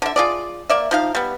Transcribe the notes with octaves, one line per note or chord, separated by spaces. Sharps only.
D3 E5
F4 G#4 D5
A#3 D5 E5
F3 D#4 F5
G3 B3